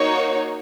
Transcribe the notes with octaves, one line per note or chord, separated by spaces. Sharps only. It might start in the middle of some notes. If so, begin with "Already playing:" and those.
Already playing: A#3 D#4 F#4 C#5